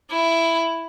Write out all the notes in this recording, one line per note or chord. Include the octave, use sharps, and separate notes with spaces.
E4